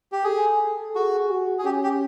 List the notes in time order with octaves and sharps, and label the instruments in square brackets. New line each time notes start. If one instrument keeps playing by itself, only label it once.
[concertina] G4
[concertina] G#4 [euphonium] A4
[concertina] F#4 [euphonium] G#4
[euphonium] F#4
[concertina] G#4
[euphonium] C#4 [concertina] G4
[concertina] G4